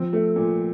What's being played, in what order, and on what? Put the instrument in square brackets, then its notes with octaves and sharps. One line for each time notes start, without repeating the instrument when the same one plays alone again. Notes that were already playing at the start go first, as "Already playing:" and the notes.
Already playing: [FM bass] F3 [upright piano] C4
[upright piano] A3
A#2